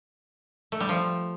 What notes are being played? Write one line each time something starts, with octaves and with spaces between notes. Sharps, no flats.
A3
G3
F3